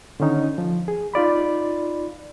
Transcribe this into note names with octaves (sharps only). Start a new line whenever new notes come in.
D3 D#3 C#4 D#4
F3
G#4
D#4 F4 D5 B5